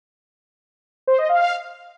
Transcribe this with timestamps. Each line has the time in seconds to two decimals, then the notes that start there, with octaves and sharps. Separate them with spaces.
1.07 C5
1.18 D#5
1.29 F5